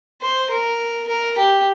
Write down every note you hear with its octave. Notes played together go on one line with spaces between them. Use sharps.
C5
A#4
A#4
G4